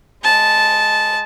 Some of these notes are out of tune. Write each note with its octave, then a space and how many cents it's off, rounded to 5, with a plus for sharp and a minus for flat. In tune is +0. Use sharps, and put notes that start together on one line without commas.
G#3 +0 A5 -10